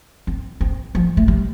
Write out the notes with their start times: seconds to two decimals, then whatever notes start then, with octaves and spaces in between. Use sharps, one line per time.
0.27 C4
0.61 C4
0.95 F3
1.17 A3
1.28 G3